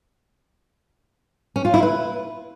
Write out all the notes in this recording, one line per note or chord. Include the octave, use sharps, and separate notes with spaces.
C#4
F4
E4
B4